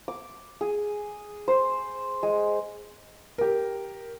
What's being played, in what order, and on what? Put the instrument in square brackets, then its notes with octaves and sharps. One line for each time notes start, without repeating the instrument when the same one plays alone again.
[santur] D6
G#4
C5
G#3
[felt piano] G4 A#4